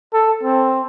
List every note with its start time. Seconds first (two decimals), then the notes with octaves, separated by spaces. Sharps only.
0.13 A4
0.43 C4